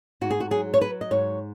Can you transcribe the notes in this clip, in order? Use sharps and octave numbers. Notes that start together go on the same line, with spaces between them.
G#2 F#4
G#4
F#4
F#3 G#4
C#5
F#3 B4
D#5
G#2 C#5